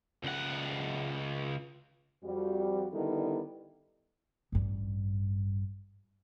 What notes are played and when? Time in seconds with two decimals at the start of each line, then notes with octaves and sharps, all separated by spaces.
0.23 C#2 F#5
2.24 F2 G3 F#4
2.92 D3 D#3 G3 B3 E4 A4
4.52 A1 G2